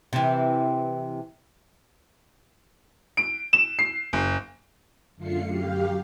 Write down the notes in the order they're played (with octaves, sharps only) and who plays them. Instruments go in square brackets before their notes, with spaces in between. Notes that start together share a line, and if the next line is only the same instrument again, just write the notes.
[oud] C3 E3
[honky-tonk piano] D7
E7
C7
F#1
[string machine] F#2 D3 A3 F4 C7 C#7
F#2 G4 F5